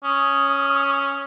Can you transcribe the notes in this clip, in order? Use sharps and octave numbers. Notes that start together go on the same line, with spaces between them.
C#4 D#6